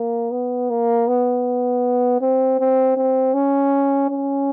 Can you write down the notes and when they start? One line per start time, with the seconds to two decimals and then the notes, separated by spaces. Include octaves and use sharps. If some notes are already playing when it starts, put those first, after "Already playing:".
Already playing: A#3
0.31 B3
0.70 A#3
1.08 B3
2.21 C4
2.59 C4
2.97 C4
3.34 C#4
4.10 C#4